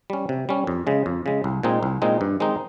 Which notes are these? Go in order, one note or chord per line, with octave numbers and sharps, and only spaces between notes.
G3 C#4
C3
G3 C#4
F2
C#3 G#3
F2
C#3 G#3
C2
A#2 G#3 C4 D#4
C2
A#2 G#3 C4 D#4
G2
D#3 G#3 C4 D#4